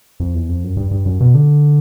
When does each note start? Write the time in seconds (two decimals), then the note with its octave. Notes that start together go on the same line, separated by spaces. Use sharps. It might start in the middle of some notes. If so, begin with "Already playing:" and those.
0.20 F2
0.35 E2
0.49 F2
0.63 F#2
0.77 G2
0.91 G2
1.06 F#2
1.20 B2
1.35 D3